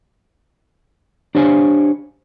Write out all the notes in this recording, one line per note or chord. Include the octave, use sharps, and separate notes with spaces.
D4 G4 C5 C#5 F5 G#5